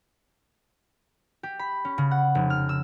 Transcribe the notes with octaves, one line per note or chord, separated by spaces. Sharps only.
G4
B5
C#4
C#3
F#5
F1
F6
E6